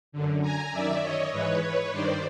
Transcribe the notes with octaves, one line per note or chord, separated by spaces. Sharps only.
F#2 D3
G#5 A#5
F#2 D#3 D5 E5
C#5 D#5
G#2 E3 B4 C#5
B4 C#5
G2 D#3 C5 D5